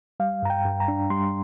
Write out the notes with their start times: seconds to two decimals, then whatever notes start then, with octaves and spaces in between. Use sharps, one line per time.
0.20 G3 F5
0.43 G2 A#5
0.50 G5
0.65 G2
0.80 A#5
0.88 D4
1.10 G3 C6